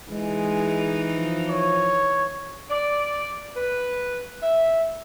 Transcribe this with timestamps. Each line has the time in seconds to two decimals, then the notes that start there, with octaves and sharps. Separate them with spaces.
0.11 E3 G#3 D#4
1.15 F3
1.49 C#5
2.70 D5
3.56 B4
4.43 E5